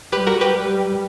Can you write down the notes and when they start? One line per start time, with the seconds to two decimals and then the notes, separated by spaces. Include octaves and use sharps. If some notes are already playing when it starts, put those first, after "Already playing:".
0.12 G3 G4 B4
0.27 F#4 A#4
0.41 G4 B4
0.56 G3